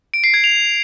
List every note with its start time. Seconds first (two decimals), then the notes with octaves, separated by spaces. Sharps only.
0.14 D7
0.24 C7
0.34 G#6
0.44 F7